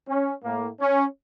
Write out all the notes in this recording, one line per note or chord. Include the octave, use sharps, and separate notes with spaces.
C#4
A2 A#3
C#4